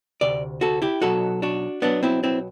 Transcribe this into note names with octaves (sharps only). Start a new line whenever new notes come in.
D2 C3 D5
F#4 A4
E4 G4
B1 B2 F#3 F#4 A4
D4 F#4
B1 B2 F#3 B3 D4
C4 E4
C4 E4